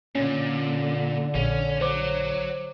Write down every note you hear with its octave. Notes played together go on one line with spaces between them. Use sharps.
A#2 D3 C#4
A#1 C#4
F#3 C5 D6